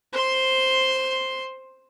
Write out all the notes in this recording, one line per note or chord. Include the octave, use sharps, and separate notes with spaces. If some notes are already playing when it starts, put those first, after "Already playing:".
C5 C6